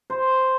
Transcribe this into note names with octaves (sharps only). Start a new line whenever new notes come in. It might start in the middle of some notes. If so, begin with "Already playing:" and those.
C5